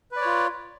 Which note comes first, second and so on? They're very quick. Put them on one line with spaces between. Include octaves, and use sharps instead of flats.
B4 D5 C#5 F4